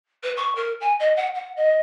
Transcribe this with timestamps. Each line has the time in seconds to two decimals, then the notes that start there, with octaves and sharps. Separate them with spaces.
0.23 B4
0.36 C#6
0.55 A#4
0.80 G#5
0.99 D#5
1.16 F#5
1.34 F#5
1.56 D#5